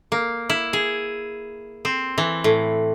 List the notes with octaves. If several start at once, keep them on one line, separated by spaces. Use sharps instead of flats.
A#3
E4
G#4
C4
E3
A2